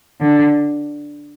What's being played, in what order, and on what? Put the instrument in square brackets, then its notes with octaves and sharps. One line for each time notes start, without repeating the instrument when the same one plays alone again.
[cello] D3